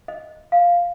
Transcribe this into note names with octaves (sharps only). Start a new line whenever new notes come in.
D#5
F5